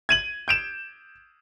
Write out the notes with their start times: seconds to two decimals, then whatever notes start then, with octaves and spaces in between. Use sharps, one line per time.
0.09 G#6 D#7 F#7
0.48 G6 D7 E7